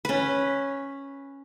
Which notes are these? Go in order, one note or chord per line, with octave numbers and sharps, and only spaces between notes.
C#4 B4